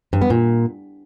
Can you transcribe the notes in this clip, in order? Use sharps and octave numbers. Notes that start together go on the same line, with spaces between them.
G2
B3
A#2